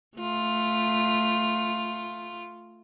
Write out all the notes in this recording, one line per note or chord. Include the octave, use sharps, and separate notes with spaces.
A3 F4